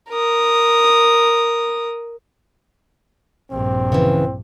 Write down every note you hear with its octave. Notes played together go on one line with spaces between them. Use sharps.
A#4 D#6
A#1 G2 C4
C#3 E3 B4